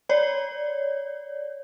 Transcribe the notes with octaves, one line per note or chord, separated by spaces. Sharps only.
C#5 D5